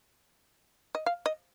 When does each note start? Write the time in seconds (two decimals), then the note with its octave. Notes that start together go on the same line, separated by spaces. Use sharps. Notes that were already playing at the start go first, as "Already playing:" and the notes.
0.95 D#5
1.06 F5
1.26 D#5